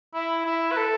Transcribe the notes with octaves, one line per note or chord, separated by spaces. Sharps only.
E4
E4
B4
A4